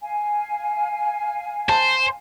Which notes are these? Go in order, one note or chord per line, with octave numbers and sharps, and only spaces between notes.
F5 G#5
C5 A5